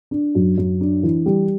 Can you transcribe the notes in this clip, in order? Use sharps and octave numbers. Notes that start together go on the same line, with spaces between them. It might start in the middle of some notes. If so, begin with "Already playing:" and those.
D4
F#2
F#2
D4
E3
G3